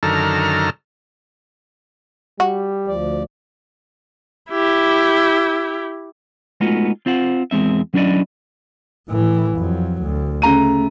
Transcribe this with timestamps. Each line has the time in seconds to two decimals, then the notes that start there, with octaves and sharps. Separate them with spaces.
0.03 F#2 D3 D#3 A4 A#5 F6
2.40 G3 F#4
2.88 D2 F3 D5
4.50 E4 G4
6.61 G#3 A3 B3 D#4 F4 F#4
7.06 C4 F4 C5 F#5
7.51 E2 G#3 C4 E5
7.94 F#3 C#4 D4 E4 D5 D#5
9.09 A2 E3
9.57 F2 F#3
10.02 D2
10.42 C#3 A3 A#5 D#7